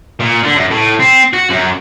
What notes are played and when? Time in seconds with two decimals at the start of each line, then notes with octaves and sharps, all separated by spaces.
0.20 A#2
0.43 D3
0.56 F#2
0.71 A2
1.00 C4
1.34 F#4
1.50 F#2